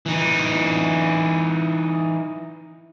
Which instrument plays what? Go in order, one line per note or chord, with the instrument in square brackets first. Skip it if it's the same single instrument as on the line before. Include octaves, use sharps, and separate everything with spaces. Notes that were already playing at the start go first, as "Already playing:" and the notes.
[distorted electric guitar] E3 D#4